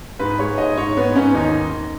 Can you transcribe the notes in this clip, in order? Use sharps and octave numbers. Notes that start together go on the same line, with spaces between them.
G#2 B4
G#3 C#5
G#2 D#5
G#2 C#5
G#2 B3
G#2 C#4
D#2 D#4